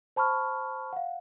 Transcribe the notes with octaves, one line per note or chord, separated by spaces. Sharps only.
C5 A5 B5 C#6 F6
F5 F#5